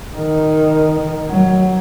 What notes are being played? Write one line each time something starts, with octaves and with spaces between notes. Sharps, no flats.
D#3
F#3